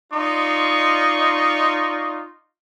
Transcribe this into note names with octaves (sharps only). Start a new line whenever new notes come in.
D#4 F4 D5 D#5 C6 C#6